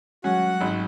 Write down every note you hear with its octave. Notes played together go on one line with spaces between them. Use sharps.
F#3 G#3 C#4 F#4 F#5
G#1 C#4